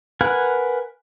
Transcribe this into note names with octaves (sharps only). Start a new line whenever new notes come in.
A#4 B4 F#5 G#5